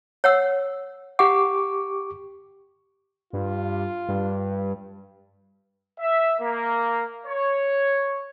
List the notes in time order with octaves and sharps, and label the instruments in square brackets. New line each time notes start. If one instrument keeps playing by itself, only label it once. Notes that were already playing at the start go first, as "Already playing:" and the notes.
[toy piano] C#5 F#5 E6
[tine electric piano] G4 C#6 D6 [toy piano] F#5
[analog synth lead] G2 [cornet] F4
[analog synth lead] G2
[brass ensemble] E5
A#3
C#5